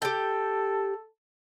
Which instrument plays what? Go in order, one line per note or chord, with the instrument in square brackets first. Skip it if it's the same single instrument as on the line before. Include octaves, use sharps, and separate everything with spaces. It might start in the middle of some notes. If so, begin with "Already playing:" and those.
[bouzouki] G4 G5 [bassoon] A4